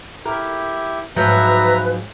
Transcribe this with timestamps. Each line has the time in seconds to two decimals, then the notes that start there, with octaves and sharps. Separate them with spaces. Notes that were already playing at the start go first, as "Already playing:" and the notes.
0.25 E4 G4 A#4
1.16 G#2 F3 F#3 B4 E5 A#5